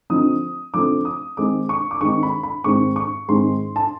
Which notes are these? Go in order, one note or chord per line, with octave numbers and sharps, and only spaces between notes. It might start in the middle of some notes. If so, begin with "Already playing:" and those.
D3 F3 A3 C4 D#4 D#6
D3 F3 A3 C4 D#4 D6
D#6
D#3 G#3 C4 D#4 D6
C#6
D6
D#3 G#3 C4 D#4 C#6
B5
B5
G#2 D#3 G#3 C4 C#6
C#6
G#2 D#3 G#3 C4 C6
A5